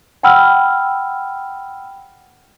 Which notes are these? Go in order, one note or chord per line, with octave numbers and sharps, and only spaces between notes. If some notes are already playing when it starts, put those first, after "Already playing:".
F#5 G5 B5 E6 F6